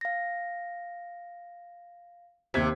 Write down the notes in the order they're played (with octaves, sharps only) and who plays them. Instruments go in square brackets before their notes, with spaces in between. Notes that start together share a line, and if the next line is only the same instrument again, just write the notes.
[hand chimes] F5 A#6
[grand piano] D#2 G#6 B6 [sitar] C3